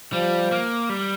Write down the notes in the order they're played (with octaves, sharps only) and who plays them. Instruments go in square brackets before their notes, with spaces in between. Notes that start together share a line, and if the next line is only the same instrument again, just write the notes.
[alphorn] F3 [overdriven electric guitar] G3
[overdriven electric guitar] A#3
G3